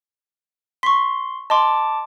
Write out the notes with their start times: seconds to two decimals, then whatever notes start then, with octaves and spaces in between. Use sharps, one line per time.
0.83 C6 C#6 B6
1.50 D#5 A5 C6 D6